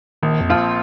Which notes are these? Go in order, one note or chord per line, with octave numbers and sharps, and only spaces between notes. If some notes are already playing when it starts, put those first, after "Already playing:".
A#1 D#3
F2
A#2 F3 C4 F4